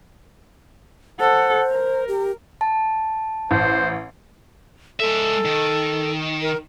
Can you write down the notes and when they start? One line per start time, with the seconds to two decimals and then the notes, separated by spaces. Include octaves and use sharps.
1.20 A4 C5 F#5
1.72 A#4
2.08 G4
2.61 A5
3.51 A1 C5
5.00 G#3 A4 E5
5.45 D#3
6.42 A#4